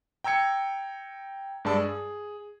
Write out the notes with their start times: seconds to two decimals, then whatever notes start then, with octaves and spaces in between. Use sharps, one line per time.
0.24 G5 A#5 E6 G#6 C#7
1.65 G2 G#3 D5 A5 E6
1.78 G#4